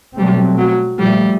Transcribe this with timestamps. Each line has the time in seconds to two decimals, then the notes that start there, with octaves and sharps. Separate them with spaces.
0.18 B2 F#3 G3 A3 C4
0.58 F#3
0.99 A#2 F3 G3 A3